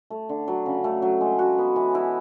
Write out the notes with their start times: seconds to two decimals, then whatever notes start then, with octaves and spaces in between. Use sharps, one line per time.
0.10 A3
0.29 D3
0.48 F#3
0.66 C#3
0.84 A3
1.02 F#3
1.21 G#3
1.39 F#4
1.58 B3
1.76 E3
1.95 E4